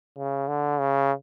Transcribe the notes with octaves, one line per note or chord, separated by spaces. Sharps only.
C#3
D3
C#3